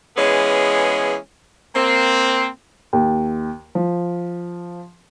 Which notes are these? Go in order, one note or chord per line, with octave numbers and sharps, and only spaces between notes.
E3 G#3 B3 C#4 G#4
A#3 C4
D#2
F3